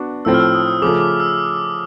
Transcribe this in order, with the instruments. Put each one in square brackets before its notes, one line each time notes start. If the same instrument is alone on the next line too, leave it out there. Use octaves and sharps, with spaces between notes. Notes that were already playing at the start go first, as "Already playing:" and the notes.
Already playing: [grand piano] B3 D4 F#4
[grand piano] A2 F3 A3 C4 [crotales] E6
[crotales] F6
E6
D#6
D#6
[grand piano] C#3 F3 A3 [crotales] D6
[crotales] D6
E6